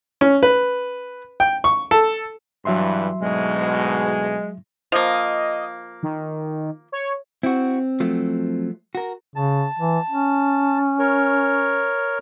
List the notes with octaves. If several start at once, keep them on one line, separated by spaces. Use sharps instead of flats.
C#4
B4
G5
C#6
A4
G2 E3 F#3 E5 C6
D2 G#2 B2 G#3
F3 A#3 D#5
D#3
C#5
C4 E4 F#4
F3 F#3 A3
F#4 A#4
C#3 A5
E3
C#4
A#4 C#5